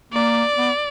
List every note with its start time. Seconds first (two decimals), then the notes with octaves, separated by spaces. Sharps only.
0.13 A#3 D5
0.57 B3